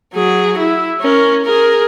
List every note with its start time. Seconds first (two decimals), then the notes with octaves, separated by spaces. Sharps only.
0.15 F#3 G#4
0.57 E4
1.01 C#4 A#4
1.44 G#4 A#4